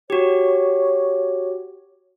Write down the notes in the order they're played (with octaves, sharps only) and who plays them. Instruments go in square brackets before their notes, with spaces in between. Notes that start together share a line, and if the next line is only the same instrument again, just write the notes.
[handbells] F#4 G4 [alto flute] C#5